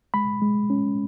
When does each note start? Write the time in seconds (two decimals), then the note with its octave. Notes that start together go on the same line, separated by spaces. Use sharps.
0.14 G#3 B5
0.42 G#3
0.70 C#4